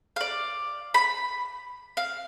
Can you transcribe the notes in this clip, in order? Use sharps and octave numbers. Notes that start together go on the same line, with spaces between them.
D5 F5
B5
F5